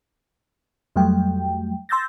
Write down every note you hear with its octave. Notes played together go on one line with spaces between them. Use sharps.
F2 F#3 G3 A3 G5
C6 E6 G6 A6 A#6